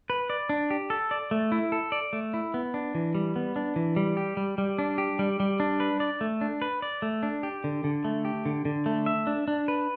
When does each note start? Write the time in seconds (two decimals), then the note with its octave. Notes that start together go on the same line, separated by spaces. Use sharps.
0.10 B4
0.30 D5
0.49 D4
0.70 G4
0.90 A4
1.11 D5
1.31 A3
1.52 E4
1.72 A4
1.92 D5
2.13 A3
2.34 E4
2.54 B3
2.74 D4
2.95 E3
3.15 G3
3.36 B3
3.56 D4
3.76 E3
3.96 G3
4.17 G4
4.37 G3
4.58 G3
4.78 D4
4.98 G4
5.19 G3
5.40 G3
5.60 D4
5.80 B4
6.00 D5
6.21 A3
6.41 D4
6.62 B4
6.82 D5
7.02 A3
7.23 D4
7.43 G4
7.64 D3
7.84 D3
8.05 A3
8.25 G4
8.46 D3
8.65 D3
8.86 A3
9.06 E5
9.27 D4
9.48 D4
9.68 B4